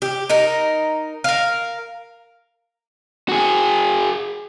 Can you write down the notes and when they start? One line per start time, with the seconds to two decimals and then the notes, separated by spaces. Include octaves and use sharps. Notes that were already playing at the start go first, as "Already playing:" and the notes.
0.02 G4
0.29 D#4 A#4
1.24 A#4 F5
3.29 F#4 G#4